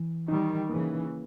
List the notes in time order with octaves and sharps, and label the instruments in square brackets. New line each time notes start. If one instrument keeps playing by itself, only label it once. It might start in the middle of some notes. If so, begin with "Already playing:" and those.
Already playing: [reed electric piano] E3
[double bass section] D#3 G3 [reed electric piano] D#4
[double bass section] C#3 E3 [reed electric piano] A#3